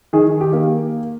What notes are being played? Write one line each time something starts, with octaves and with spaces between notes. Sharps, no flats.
D#3 G#4
G4
A#3